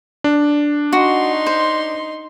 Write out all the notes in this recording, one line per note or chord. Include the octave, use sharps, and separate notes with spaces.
D4
D#4 F#4 C6
C5